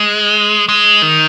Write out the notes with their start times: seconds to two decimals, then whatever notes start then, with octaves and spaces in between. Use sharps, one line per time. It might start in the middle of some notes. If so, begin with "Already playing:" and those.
Already playing: G#3
0.69 G#3
1.02 D#3